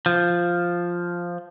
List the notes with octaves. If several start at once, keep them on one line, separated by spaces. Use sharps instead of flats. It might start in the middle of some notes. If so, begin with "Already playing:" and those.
F3